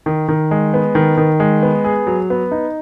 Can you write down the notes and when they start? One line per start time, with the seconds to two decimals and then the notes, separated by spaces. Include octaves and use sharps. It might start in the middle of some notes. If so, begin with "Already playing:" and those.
0.06 D#3
0.28 D#3
0.51 G#3
0.74 B3
0.95 D#3
1.17 D#3
1.40 G#3
1.63 B3
1.84 G#4
2.07 F#3
2.30 B3
2.51 D#4